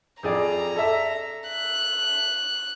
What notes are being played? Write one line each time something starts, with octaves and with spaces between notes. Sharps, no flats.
F2 G#4 D5 A#5
A4 E5
F#6